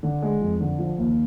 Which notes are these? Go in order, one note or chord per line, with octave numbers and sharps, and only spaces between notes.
D3
G#3
F2
D3
F3
D#2